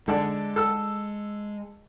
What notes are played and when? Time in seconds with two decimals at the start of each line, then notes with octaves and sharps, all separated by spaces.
0.08 D3 G#3 A4 D5
0.56 A4 E6